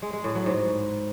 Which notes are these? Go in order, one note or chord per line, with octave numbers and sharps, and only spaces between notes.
G#3
G#3
A2
F#3
G#2